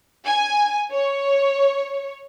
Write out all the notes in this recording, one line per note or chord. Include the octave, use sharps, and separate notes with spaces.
G#5
C#5